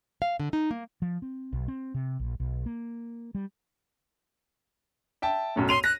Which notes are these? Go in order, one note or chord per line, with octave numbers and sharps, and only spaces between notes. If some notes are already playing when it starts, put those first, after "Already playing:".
F5
D3
D#4
A#3
F3
C4
B1
C4
C3
A#1
B1
A#3
G3
E5 G5 A5
B1 F#2 A2
C6 D#7 F7
F#6 A#6